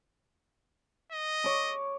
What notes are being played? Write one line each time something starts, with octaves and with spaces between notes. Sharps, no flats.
D#5
C#5 D6